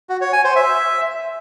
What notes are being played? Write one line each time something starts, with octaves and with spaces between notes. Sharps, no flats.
F#4
C#5
G#5
C5
E5